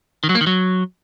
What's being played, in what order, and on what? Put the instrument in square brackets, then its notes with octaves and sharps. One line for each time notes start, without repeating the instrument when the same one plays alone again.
[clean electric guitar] D#3
F#3
A#3
D#3
F#3